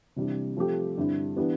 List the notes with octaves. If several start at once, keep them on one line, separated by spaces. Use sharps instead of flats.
C3 E3 G3 D4
F3 A3 C4 G4
G2 D3 G3 C4 E4
E3 B3 D4 G4